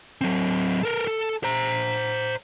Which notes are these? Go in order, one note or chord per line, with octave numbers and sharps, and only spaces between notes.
F#3 C4
A4 A#4
A4
C5 A#5